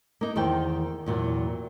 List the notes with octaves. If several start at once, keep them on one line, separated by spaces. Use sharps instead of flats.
A#3 D#4 A#4
E2 D#3 C5 G5
E2 A#2 F#3